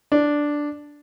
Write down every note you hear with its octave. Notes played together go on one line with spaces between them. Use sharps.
D4